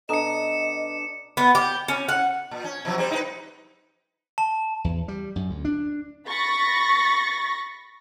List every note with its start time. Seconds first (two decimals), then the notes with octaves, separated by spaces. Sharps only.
0.09 B2 D4 A4 D#5 A#5 D#6 C#7 E7
1.37 B3
1.55 G4
1.88 C#4
2.09 F#5
2.51 A#2
2.64 C#4
2.85 B2 F3 F#3
2.98 G3 C4 C5
3.11 D#4 E4 B4
4.38 A5
4.84 E2
5.08 G3
5.36 F#2
5.50 D2
5.65 D4
6.28 B5 C#6 A6 A#6